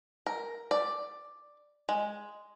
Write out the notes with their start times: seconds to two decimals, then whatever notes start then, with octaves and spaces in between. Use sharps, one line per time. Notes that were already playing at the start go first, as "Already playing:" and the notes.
0.26 A#4
0.71 D5
1.89 G#3